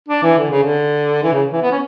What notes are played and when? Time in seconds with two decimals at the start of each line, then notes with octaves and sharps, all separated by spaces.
0.08 D4
0.23 E3
0.38 D3
0.50 C#3
0.63 D3
1.23 E3
1.32 C#3
1.52 E3
1.62 B3
1.71 C#4